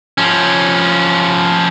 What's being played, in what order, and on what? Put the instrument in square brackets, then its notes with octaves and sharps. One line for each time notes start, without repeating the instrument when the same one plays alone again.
[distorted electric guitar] F3 C#4